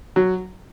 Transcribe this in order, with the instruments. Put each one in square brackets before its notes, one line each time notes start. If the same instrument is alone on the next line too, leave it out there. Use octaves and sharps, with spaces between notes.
[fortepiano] F#3